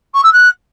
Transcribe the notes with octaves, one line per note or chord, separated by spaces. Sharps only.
C#6
E6
F#6